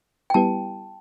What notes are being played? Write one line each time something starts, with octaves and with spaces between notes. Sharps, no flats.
G5
G3 B3 E4 G4 B4 A5